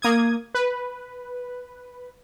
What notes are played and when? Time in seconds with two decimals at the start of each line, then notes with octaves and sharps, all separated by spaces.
0.02 A#3 D#6 G#6
0.54 B4